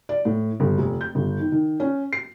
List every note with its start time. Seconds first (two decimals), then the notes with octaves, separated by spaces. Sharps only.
0.09 D5
0.25 A2
0.60 G1
0.78 F1
1.01 G6
1.15 G1
1.40 D#3
1.52 D#3
1.80 C#4
2.13 C7